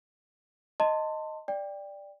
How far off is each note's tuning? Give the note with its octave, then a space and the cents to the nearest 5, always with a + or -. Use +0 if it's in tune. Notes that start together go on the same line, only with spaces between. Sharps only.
D#5 +0 A5 +25 C6 +0
D5 +0 G5 +15